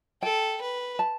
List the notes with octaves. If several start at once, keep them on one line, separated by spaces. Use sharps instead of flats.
A4 G5
B4
A5